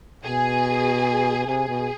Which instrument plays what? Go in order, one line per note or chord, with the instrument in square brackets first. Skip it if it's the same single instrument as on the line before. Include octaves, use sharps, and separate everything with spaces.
[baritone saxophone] B2 [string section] G#4
[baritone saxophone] C3 [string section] G#4
[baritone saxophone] B2